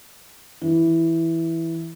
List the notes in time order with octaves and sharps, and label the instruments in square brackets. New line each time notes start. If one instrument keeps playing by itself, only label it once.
[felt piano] E3